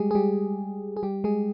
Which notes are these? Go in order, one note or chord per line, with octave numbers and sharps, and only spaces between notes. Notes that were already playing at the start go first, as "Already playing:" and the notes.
Already playing: G3 G#3 G4 G#4
G#4
G3 G4
G#4
G3 G4
G#3 G#4